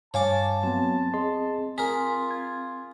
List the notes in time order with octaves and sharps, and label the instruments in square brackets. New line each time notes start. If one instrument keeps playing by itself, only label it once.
[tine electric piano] G2 G3 F5 [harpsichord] C#5 G#5 D6 [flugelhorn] A5
[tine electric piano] F#3 B3 [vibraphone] C4
[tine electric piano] G#4 D#5 C6
[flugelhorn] F4 [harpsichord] G#4 A#4 [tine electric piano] B6
[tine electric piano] G#6